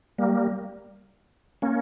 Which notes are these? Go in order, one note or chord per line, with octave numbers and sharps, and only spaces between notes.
G3 A#3
A#3 C#4